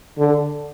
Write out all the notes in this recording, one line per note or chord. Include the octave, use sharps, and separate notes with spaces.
D3